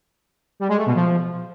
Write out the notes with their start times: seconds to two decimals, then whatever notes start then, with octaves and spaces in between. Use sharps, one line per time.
0.60 G3
0.68 G#3
0.77 A3
0.86 B2
0.95 F3